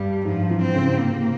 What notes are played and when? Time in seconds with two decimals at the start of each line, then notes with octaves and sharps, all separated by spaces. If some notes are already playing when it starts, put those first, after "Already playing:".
Already playing: G2 G3
0.25 G#2 F3
0.50 E3
0.62 C4
0.74 C#3
0.99 C3 A#3